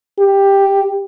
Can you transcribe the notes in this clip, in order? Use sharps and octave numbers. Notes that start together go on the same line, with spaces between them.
G4